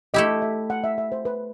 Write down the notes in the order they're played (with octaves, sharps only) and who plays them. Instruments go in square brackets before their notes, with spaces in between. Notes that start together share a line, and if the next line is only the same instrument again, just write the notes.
[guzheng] A3 E4 G4 [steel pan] D#5
[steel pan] E5
F#5
E5
E5
C5
B4